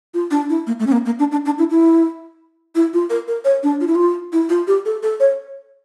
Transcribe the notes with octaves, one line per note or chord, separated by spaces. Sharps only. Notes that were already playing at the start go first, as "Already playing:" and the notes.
F4
D4
E4
A#3
A3
C#4
A#3
A#3
D4
D4
D4
E4
E4
E4
F4
A#4
A#4
C#5
D4
F4
E4
F4
E4
F4
G4
A4
A4
C#5